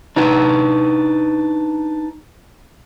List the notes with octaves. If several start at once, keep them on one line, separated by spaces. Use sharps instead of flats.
D4 D#4 B4